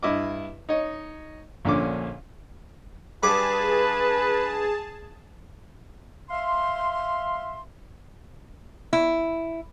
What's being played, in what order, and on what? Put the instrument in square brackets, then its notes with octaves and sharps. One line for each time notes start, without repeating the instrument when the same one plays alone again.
[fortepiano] G2 E4 D#5 D6
D#4 C#5 D#5
A#1 A#2 D3 C#4 D6
[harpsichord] G2 D6 [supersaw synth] G#4 A5 [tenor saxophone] B4
[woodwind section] E5 F5 C6
[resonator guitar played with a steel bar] E4